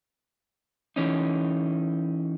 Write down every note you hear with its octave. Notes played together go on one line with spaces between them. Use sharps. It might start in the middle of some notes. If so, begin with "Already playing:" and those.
E3 C#4 D#4